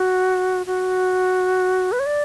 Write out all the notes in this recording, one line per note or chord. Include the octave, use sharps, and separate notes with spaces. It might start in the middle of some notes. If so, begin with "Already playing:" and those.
Already playing: F#4
F#4
B4
C#5
D5